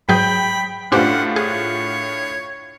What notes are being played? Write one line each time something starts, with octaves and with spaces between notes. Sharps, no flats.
G#2 F#3 G#4 G5 B5 G6
A2 C#4 D4 F4 G4 C5 F#5
G#4 C#5